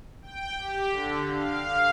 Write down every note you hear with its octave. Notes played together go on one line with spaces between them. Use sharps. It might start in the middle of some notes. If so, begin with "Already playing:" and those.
G5
G4
D3
F5